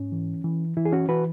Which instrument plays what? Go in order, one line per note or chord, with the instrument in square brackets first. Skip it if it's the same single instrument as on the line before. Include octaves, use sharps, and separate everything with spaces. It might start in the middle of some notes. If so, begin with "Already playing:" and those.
Already playing: [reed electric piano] G#2 C#4
E3
E3
E3 E4
G#4
C#4 F#4
E3 F#4 B4